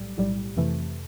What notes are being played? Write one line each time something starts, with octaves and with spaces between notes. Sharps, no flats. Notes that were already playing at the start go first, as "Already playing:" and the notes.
Already playing: B1 A2 G3
B1 A2 G3
F2 C3 E3 A3